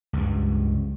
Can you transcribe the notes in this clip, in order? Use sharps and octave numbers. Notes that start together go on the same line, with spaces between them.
C#2 G2